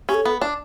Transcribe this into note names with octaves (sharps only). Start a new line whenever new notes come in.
C#4 G4
A4
B3
D4